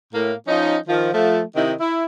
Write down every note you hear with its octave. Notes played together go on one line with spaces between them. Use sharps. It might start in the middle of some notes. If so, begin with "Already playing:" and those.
A2 A#3
F3 C#4 D#4
D#3 F3
F3 A3
C3 D#3 D#4 E4
E4